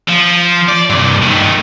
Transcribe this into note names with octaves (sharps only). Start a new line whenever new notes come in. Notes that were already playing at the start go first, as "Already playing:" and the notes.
F3
D5
C2 G2
D#3 A3